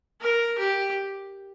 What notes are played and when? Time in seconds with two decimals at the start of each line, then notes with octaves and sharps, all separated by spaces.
0.21 A#4
0.58 G4